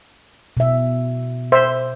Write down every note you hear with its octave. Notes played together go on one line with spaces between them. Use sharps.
B2 E5
C5 E5